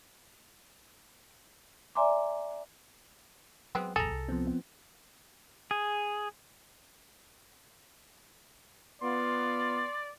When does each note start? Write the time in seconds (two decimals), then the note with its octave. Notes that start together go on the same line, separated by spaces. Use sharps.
1.95 D5 E5 G#5 A#5 C6 D6
3.75 F#3 G#3 B3 C4
3.96 E1 A1 D2 G#4 A4 A#5
4.11 C2
4.29 F3 B3 C4
5.71 G#4
9.02 B3 F4 D5 C6